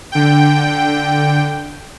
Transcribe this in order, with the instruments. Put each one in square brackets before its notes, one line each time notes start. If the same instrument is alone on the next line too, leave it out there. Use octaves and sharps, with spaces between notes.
[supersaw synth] D3 G5